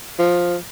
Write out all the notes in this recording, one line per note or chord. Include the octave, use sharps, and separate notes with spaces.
F3